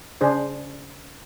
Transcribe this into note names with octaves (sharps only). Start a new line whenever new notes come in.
C#3 D4 G#4 C5